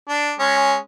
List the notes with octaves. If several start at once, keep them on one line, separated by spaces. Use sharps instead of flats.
D4
G#3 C#4